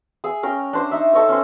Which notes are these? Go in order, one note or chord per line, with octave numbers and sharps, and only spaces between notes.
G#4 E6
C#4 A#4 G5
D4 C5 C6
D#4 E5 D6
A4 C#5 D#5 E6
C#4 C5